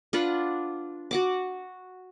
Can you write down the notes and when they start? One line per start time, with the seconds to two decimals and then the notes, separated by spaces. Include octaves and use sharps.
0.13 D4 F4 B4 F#5
1.11 F#4 F#5 D6